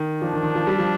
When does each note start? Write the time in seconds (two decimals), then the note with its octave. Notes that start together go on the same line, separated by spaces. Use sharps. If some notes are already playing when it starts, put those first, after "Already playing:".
Already playing: D#3
0.22 F3 D4
0.33 D#3
0.43 D#3
0.55 F3
0.67 G3
0.78 F3